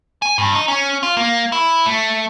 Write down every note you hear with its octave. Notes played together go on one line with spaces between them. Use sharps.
G#5
G2
D#4
C#4
F4
A#3
E4
A3